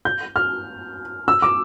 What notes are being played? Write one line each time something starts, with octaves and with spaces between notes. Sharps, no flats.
G6
F6
E6
D6